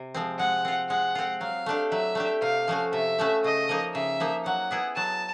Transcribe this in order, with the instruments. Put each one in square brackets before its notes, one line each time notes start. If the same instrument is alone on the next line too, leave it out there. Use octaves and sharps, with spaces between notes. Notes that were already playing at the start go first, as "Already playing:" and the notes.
Already playing: [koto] C3
F3 G#3 C4
[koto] G#3 [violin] F#5
[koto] C4 F4
[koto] G#3 [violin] F#5
[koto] C4 F4
[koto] F#3 [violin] F5
[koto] A3 D4 G4
[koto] F#3 [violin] E5
[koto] A3 D4 G4
[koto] C3 [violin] F5
[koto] F3 A3 C#4 F#4
[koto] C3 [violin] E5
[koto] F3 A3 C#4 F#4
[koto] C#3 [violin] D#5
[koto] F3 A#3 D#4
[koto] C#3 [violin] E5
[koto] F3 A#3 D#4
[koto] F#3 [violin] F#5
[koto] B3 E4 G#4
[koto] F#3 [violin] A5